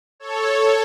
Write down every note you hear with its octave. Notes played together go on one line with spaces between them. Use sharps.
A4 C#5